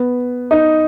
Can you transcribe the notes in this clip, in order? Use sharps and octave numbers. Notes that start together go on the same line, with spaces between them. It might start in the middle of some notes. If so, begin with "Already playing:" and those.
Already playing: B3
D#4